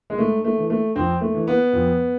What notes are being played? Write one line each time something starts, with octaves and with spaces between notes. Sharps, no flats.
G#3
G#2 A3
A3
E3
A3
F2 C4
A3
E3
B3
F2